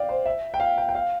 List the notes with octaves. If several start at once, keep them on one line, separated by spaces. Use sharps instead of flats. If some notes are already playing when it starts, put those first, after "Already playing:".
Already playing: D5 F5 G5
C5
E5
G5
F5
G5
G5
F5